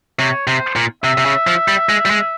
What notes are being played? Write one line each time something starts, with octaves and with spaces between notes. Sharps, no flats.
C3 C#5
C3 C5
A#2
C3 E5
C3
C#3
F3
G3
G#3
G3
G#3